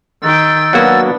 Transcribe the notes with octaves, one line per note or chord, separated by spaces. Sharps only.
D#3 G5 E6 A6
F#3 A#3 B3 D4 F#4